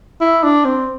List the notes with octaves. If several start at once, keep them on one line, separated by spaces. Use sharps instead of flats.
E4
D4
C4